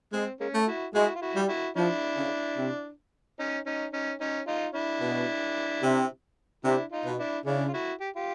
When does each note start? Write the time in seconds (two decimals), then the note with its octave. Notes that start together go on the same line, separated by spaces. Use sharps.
0.13 G#3 C4
0.40 G#3 A#3 C#4
0.54 A3
0.67 E4 F#4
0.95 G#3 E4 F#4
1.15 F4
1.22 E4 F#4
1.36 G3
1.49 E4 F#4
1.76 F3 D4 E4
2.16 C#3
2.58 C3
3.39 C#4 D#4
3.66 C#4 D#4
3.93 C#4 D#4
4.20 C#4 D#4
4.47 D#4 F4
4.74 D4 E4
5.01 B2
5.83 C3
6.65 C3 D4 E4
6.92 D#4 F4
7.05 B2
7.19 D4 E4
7.46 C#3 D4 E4
7.68 F4
7.73 E4 F#4
8.01 G4
8.16 F4 G4